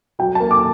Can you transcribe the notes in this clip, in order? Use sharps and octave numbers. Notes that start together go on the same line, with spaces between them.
F#3 G5
A5
A#3
D6